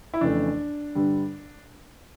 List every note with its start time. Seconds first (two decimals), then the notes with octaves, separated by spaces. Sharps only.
0.14 E4
0.21 F2 C#3 E3 A3 D4
0.95 G2 D3 G3